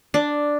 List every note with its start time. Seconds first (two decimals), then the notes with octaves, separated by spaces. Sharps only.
0.14 D4